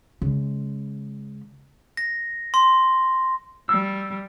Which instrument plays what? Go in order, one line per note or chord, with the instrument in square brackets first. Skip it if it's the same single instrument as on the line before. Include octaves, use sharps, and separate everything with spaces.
[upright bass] C#3 G#3
[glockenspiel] A#6
C6
[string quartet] G3 [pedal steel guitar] E6